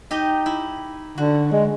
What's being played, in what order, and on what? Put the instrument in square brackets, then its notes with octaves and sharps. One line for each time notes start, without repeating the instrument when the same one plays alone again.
[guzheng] D#4 G4 D#5
E4
[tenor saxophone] D3 [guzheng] F#4
[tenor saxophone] G#3